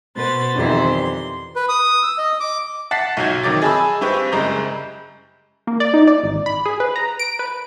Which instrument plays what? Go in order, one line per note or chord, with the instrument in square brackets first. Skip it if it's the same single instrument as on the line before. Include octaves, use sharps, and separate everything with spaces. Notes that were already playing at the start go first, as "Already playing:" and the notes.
[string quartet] B2 B4 C5 A6
F2 D#3 E3 G3 C5 E5
C6
[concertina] B4
D#6
E6
D#5
D6
[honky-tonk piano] F#5 A5 A6 B6 C7
B1 F#3 G6 G#6
F2 D#3 F#3 D6 A6
G#4 D#5 G#5 A5 B5 E6
G2 C4 G4 B4 C#6 G6
F#1 G3 G#3 A#5 G6
[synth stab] A#3
D5
D#4
D5
G#1
B5
G#4
B4
A#5
D7
B4